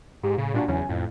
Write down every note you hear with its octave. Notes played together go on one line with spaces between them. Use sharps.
G#2 G4
A2 C#3
A#2 G3 D4 F#4
E2 C#3 F#3 C#4 G#5
F2 A2